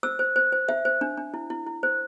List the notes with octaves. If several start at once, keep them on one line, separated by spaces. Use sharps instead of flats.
C5 E6
C5
C5
C5
C5 E5
C5
D4
D4
E4
E4
E4
C5